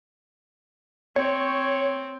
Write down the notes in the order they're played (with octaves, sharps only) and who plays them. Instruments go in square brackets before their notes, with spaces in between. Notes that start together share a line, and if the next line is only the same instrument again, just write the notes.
[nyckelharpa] C4 [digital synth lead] C#5